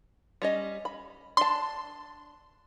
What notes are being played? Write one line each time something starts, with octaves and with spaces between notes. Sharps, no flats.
G3 C#4 D#5
B5
D4 A5 C6